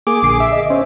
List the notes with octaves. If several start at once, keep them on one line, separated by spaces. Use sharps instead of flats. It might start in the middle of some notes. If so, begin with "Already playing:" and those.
A#3 G#4 D6
A#1 D3 C7
E5
D#5
C#4 C5